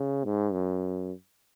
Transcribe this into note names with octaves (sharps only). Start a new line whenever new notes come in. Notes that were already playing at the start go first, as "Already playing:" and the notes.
Already playing: C#3
G#2
F#2